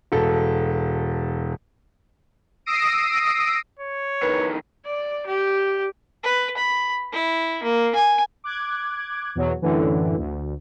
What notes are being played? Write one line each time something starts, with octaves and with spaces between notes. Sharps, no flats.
E1 A4
D#6 E6 A#6 C7 D7 D#7
C#5
F2 D#3 B4
D5
G4
B4
B5
E4
A#3
G#5
D6 F#6 G#6
E2 B2 F#3
F#2 A2 D3 E3
D2